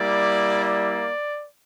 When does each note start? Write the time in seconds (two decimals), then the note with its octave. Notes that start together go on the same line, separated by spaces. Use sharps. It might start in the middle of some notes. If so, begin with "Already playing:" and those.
Already playing: G3 A#3 E4 D5
0.64 D5